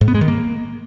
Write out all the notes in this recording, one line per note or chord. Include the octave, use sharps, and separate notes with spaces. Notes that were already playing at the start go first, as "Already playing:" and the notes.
G#2
B3
G#3
D#3
A#3